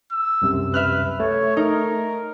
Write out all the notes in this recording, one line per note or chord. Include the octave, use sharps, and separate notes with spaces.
E6
C2 F#2 C3
B4 E5 F6 F#6
A3 C#5
D#4 A#4